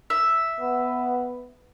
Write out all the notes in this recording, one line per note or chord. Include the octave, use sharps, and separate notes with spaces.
E5
B3